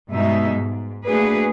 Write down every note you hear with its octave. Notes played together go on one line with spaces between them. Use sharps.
G2 B2 G3 G#3 D#4 E5
G#2
A3 A#3 D4 F#4 G#4 B4